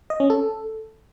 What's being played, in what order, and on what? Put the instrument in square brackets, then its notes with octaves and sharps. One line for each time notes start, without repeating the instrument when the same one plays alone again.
[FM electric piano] D#5
C#4
A4